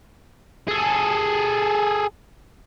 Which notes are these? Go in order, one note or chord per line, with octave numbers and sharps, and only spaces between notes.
G#4 A4